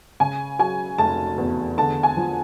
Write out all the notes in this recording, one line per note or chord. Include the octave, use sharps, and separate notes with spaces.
C#3 G#5
F#3 G#5
F1 A5
E2
D3 A5
G#5
F3